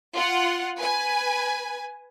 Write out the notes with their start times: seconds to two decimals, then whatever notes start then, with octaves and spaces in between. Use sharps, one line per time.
0.15 F4 F#5
0.79 B4 G#5